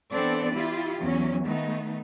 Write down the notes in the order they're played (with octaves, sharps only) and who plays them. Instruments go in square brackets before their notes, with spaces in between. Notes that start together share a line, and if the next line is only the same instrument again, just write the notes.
[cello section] E3 B3 C4 D4 A4 D5
E4 F4 G4
E2 F#3 C#4
D#3 A3 B3 D#4